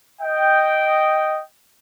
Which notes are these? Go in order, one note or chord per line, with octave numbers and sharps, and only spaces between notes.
D#5 G5